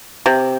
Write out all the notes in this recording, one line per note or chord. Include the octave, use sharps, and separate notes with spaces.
C3